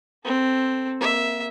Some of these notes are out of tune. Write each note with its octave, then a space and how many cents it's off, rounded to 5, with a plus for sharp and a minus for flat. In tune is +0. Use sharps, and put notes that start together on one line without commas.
C4 +0 A4 +0
A#3 +20 E5 -5